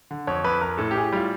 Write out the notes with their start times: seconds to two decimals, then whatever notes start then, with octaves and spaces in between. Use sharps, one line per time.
0.11 D3
0.27 F2 C#5
0.44 F2 B4
0.61 F2 A#4
0.78 A2 A4
0.91 G4
0.95 A2 G#4
1.04 G4
1.13 G3 F4